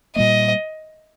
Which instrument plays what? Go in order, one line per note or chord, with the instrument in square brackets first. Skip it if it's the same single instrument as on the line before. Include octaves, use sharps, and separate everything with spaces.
[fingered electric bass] A#2 G3 A#3 [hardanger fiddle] D#5